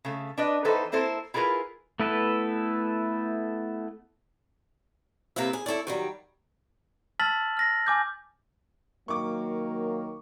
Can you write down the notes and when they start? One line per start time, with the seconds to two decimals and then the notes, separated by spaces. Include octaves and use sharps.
0.05 C#3 A3
0.38 D4 B4 D#5
0.65 E3 B3 D#4 A4 B4 C5
0.92 A#3 C4 E4 A4 C5
1.34 E4 F4 G#4 A#4 B4
2.00 A3 B3 E4 A4 B4
5.36 C3 A#3 E4 B4 E5
5.53 G#4
5.66 E4 A4 C#5 D5
5.87 D#3 F#3 G3
7.20 A5 E6 F6 A6 B6 F#7
7.57 F6 A#6 B6
7.87 G#5 D6 G6
9.08 D#3 F#3 A#3 C#6 D6